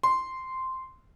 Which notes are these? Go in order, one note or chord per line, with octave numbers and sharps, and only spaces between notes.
C6